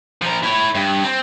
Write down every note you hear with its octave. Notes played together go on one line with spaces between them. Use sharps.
F3 A#4
E4 C#5
G2
C4